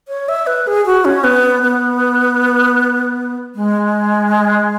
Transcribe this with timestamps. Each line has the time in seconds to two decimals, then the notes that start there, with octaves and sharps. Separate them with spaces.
0.08 C#5
0.29 E5
0.47 B4
0.67 G#4
0.86 F#4
1.05 C#4
1.24 B3
1.62 B3
3.55 G#3